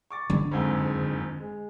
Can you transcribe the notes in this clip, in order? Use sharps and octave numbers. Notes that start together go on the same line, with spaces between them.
C#6 D6 A6
D3
F#1 F2 G#2
G#3